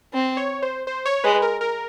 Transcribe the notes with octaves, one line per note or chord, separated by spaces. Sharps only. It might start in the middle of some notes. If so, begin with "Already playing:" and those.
C4
C#5
C5
C5
C#5
G#3 B4
A#4
A#4